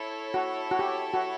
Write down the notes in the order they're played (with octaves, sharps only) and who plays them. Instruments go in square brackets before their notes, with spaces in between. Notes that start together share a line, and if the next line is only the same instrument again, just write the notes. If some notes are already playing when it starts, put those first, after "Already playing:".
Already playing: [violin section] E4 A4 C#5
[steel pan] F#4
F#4
G4
F#4